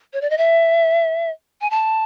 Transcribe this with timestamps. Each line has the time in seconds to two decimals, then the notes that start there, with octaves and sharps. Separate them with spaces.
0.13 C#5
0.21 D5
0.30 D#5
0.38 E5
1.61 G#5
1.71 A5